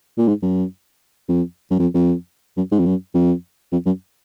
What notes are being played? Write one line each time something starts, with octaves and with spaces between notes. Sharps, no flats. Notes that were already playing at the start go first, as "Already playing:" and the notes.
A#2
G#2
F#2
F2
F#2
F2
F2
F#2
G#2
F2
F#2
F2
F2
F#2